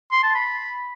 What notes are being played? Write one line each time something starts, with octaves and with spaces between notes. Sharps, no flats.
C6
A5
B5